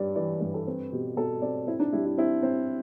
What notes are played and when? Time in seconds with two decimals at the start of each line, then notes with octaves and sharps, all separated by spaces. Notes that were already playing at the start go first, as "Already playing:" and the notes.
Already playing: G2 G3 D5
0.15 E3 D5
0.41 G2
0.54 A4
0.67 C4 B4
0.91 B2 G4
1.16 B2 A4
1.42 C4 D5
1.67 C4 E4
1.80 D4
1.93 G3 E4
2.05 E4
2.18 C4 E4
2.43 C4